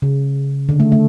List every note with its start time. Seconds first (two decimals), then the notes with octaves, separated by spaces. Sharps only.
0.02 C#3
0.69 D3
0.80 A3
0.92 A3